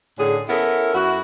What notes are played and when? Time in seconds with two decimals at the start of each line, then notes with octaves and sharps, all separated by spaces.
0.18 A2 D3 C#4 G#4
0.48 B3 C#4 E4 A4 A#4
0.94 F#2 E4 F#4